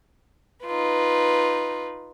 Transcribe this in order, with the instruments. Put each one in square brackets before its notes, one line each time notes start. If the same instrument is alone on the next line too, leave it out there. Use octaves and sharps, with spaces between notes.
[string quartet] D#4 F4 B4